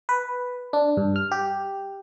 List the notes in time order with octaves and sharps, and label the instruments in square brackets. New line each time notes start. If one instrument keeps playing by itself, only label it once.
[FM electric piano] B4
D4
G2
F6
G4